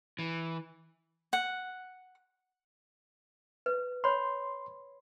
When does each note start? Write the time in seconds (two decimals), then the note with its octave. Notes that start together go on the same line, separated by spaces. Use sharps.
0.19 E3
1.33 F#5
3.66 B4
4.04 C#5 B5 C6